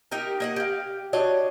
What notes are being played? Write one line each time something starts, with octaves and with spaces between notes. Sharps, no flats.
D#4 G4 A#4
A#3 D#5 F#5
G4 F5
D4 F#4 C#5 D#5